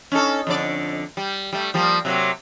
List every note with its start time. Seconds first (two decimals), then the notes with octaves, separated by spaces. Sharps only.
0.12 C#4 D#4 A4
0.47 F2 D3 D5
1.17 G3
1.53 G3 A3
1.74 F3 G3 A#3
2.05 C3 F#3 A#3